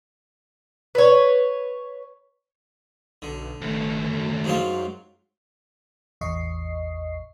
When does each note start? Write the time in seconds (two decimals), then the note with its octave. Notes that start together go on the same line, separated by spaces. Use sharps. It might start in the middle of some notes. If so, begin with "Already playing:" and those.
0.95 B4 C#5
3.22 B1 D3
3.61 G1 D#2 A3
4.10 F#2
4.44 G#2 F#3 F4
6.21 A1 E2 D#5 C#6 C7